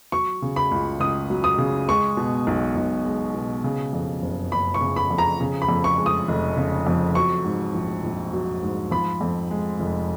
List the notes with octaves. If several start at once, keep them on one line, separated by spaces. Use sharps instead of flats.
F#3 C#6
C#3
B5
C#2
C#2 D#6
F#3
D#6
C#3
G#3 C#6
B2
B1
B1
G#3
B2
C#3
F2
F#1
F#1 B5
C#6
C#3
B5
F2
A#5
C#3
B5
F2
C#6
G#3
D#6
F1
C#3
F2
F#3 C#6
G#2
A#1
A#1
F#3
G#2
F3 B5
F2
G#3
F1